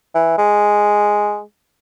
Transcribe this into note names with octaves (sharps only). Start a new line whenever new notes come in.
E3
G#3